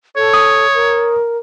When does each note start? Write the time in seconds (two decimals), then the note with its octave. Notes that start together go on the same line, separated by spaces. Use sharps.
0.16 A4 C#5
0.34 D#6
0.74 A#4